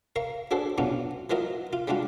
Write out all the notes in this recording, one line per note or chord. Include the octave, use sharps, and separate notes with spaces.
A#4 F5 C#6
D4 F#4 G#4 A4 C5
B2 F#3 C#4 D4 F4
E3 F3 F4 F#4 A#4 D#5
F4
G3 G#3 D4 F4 F#4